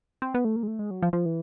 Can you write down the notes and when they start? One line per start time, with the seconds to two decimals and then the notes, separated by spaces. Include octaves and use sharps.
0.22 C4
0.34 B3
0.45 A3
0.56 A#3
0.63 G#3
0.67 A3
0.79 G#3
0.91 F#3
1.02 F3
1.13 F3
1.26 E3